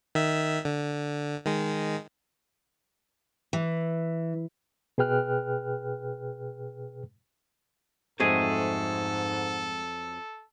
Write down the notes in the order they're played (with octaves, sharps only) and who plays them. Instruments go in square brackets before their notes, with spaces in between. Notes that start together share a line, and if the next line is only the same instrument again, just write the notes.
[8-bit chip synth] D#3 E5
D3
D#3 G#3
[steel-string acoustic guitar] E3
[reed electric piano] B2 G#4 B4 G5 F6 F#6
[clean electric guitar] F2 F#3 G#4 [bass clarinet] G#2 [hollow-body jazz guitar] G#3 A3 C4 [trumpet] A4